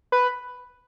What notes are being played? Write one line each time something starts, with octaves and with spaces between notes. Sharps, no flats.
B4